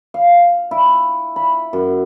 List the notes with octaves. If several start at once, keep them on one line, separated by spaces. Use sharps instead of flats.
F5
E4
B5
F#2